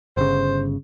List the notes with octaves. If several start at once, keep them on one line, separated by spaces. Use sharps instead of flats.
G1 C#3 C5